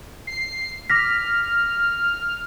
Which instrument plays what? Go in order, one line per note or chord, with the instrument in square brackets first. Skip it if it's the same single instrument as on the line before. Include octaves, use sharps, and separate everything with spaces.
[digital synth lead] C7
[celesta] D6 A#6 B6 [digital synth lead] F6